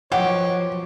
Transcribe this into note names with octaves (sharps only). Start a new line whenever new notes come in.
B2 F3 F#3 G4 C#5 F#5